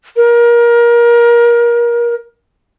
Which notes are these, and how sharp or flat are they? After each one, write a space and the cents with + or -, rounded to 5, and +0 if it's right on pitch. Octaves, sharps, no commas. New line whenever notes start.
A#4 +25